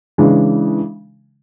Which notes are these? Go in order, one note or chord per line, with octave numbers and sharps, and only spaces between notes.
C#3 E3 G#3 D4